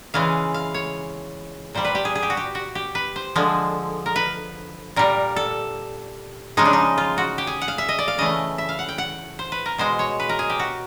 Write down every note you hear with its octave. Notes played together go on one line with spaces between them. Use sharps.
C#3 E3 G#3 F5
F5
C#5
A#2 G3 C5
B4
G4
G#4
G#4
G4
F#4
G4
F#4
G4
B4
C5
D3 F3 G#3
A#4
B4
A#2 G3 A#4
A4
C#3 F3 G#3 D#4
D4
D#4
F4
F#4
G4
G#4
F#5
F5
E5
D#5
D5
F5
C#3 E3 A3 D#5
E5
F5
F#5
G5
F#5
C5
B4
A#4
B2 G#3 C5
C#5
B4
A#4
G#4
G4
F#4